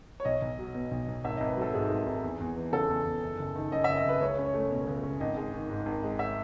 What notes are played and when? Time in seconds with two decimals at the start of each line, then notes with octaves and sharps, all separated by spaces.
0.20 C#5
0.25 B1 D#5
0.42 B1
0.59 F#3
0.75 B2
0.91 B1
1.08 B1
1.24 G#1 E5
1.36 G#1 D#5
1.49 B4
1.57 F#3 A4
1.74 G#2 G#4
1.90 G#1
2.06 G#1
2.23 E2
2.40 E2
2.56 E3
2.72 C#3 A4
2.89 E2
3.05 E2
3.22 F#1
3.39 F#1
3.56 D#3
3.72 F#2 D#5
3.84 F#1 E5
3.97 D#5
4.05 F#1 B4
4.21 C#2 C#5
4.38 C#4
4.46 C#5
4.54 A3
4.70 B2
4.87 C#2
5.03 C#4
5.20 G#1 D#5
5.37 G#3
5.53 D#3
5.70 G#2
5.86 G#1
6.03 G#3
6.19 E5